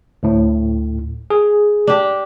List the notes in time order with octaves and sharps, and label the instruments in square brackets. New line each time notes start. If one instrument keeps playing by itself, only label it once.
[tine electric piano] D2 A2
G#4
[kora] D4 G4